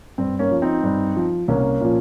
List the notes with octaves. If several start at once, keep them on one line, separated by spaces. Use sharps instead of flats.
G2 C4
A#3 C#4
F3
C4 D#4
G2
F3
C2 A#3 C#4
A#2 F3